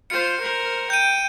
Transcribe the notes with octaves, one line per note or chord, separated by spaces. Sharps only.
F4 C5 C#7
A#4 C5
G5 G6 D#7